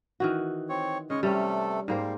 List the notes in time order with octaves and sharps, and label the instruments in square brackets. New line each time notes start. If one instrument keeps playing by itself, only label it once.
[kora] D#3 E3 F#4
[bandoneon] C4 C#5
[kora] C#3 [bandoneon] G#3 C#5 D#5
[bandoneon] C3 A3 A4 [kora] G3 C#4
[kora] G#2 A#3 C5 [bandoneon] G3